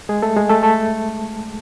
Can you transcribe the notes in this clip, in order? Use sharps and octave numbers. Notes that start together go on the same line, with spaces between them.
G#3 G#4
A3 A4
G#3 G#4
A3 A4
A3 A4